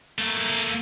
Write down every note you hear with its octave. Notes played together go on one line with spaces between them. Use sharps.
A3 A#3